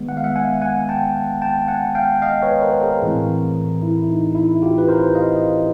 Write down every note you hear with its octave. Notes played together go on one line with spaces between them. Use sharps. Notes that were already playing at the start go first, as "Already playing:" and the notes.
Already playing: D#3 G#3 B3
F#5
F5
E5 F#5
F#5 G#5
F#5 G#5
G5 A5
G5 A5
F#5 G#5
F5 G5
D#5 F5
B4 C#5
A#4 C5
G#4 A#4
A2 E3 A3 C4
E4
D#4
E4
F4 G4
B4
A#4 C5
D#5 F5